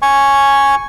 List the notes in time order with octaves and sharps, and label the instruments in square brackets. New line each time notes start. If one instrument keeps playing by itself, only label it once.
[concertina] G#5 C#6